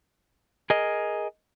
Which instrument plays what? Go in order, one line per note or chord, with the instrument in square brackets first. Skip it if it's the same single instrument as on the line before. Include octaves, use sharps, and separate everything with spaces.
[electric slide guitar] G#4 A#4 D#5